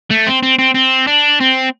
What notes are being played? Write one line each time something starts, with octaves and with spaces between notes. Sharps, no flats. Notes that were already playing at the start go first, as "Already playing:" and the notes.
A3
C4
C4
C4
C4
D4
C4